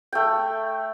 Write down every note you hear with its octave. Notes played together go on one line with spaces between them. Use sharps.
A3 G5